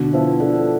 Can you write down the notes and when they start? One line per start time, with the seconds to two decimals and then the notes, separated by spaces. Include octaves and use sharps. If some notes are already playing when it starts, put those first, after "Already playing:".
Already playing: B2 D3
0.13 F3 B3 E4
0.40 D3